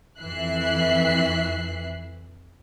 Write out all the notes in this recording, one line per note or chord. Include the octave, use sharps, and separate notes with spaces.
F2 E3 E5 F#6 C7